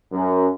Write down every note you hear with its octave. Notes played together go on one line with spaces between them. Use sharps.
F#2